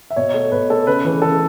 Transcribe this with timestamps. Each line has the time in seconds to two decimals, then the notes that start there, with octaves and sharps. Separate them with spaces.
0.10 E5
0.16 B2 C#5
0.34 A3
0.52 B2 B4
0.70 A3 A4
0.87 C#3 B4
1.05 E3 A3 B4
1.22 C#3 A4